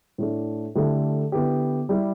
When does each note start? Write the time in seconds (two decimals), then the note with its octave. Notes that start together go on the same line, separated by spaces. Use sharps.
0.18 A2 A3 D4
0.75 D3 A3 E4 G4
1.32 D3 B3 E4 G4
1.89 G3 E4 G4